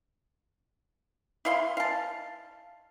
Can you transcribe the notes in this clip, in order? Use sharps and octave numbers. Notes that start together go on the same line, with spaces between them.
E4 F5 C6
F5 A5